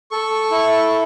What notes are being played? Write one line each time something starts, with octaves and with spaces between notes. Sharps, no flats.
A4 C#6
E4